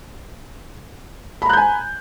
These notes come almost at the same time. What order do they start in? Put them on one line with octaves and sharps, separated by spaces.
B5 A#5 F#6 G6 G#5